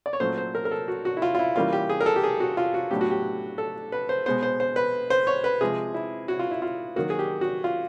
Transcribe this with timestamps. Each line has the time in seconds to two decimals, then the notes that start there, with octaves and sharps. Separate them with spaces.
0.06 D5
0.13 C#5
0.20 A#2 F#3 A3 C#4 C5
0.38 C5
0.55 A#4
0.65 A#4
0.71 A4
0.88 F#4
1.05 F#4
1.17 E4
1.22 F4
1.35 F4
1.39 E4
1.56 E3 G3 A#3 C#4 F4
1.73 G4
1.89 G#4
2.01 A#4
2.06 A4
2.16 G4
2.23 G#4
2.40 F#4
2.57 F4
2.74 F#4
2.91 A2 F#3 B3 D4 G4
3.01 F#4
3.11 G4
3.58 A4
3.92 B4
4.09 C5
4.26 B2 G#3 B3 C5
4.43 C5
4.60 C5
4.76 B4
5.10 C5
5.27 C#5
5.44 B4
5.61 C3 F3 G#3 G#4
5.94 E4
6.28 F#4
6.39 F4
6.51 E4
6.62 F4
6.96 D#3 F#3 A#3 F#4
7.10 G#4
7.19 G4
7.41 F#4
7.64 F4